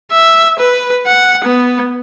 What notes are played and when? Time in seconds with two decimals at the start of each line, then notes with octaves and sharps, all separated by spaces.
0.11 E5
0.59 B4
1.07 F#5
1.44 B3